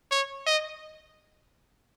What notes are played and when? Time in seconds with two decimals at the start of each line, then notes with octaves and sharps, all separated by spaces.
0.11 C#5
0.47 D#5